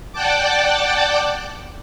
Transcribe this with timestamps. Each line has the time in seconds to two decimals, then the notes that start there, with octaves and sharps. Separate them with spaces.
0.13 D5 F#5 G5 A5 D6